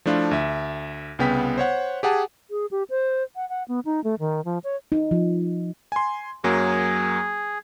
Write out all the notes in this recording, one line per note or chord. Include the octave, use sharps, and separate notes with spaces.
F3 A3 D4 E4 F4
D2 E5
C2 C#3 B3 G5 B6
C5 C#5 F#5
G4 G#4 F#5 G#5 A5
G#4
G4
C5
F#5
F#5
B3
D#4
A3
D#3
F3
C#5
D#4
F3
G#5 C6
F#2 F#3 A#3 G#4